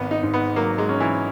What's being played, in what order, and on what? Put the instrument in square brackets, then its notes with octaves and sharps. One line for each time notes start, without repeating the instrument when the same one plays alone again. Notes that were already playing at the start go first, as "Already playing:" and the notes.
Already playing: [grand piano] G#1 [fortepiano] B3
[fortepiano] D#4
[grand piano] G#2
[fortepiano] B3
[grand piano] F#3 [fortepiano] A#3
[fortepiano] G#3
[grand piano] C#4
[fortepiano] E3